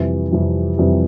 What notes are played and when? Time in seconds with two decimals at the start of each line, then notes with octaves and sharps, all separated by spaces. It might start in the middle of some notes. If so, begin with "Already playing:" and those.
Already playing: F2 C3 E3 G3
0.31 F2 C3 E3 G3
0.78 F2 C3 E3 G3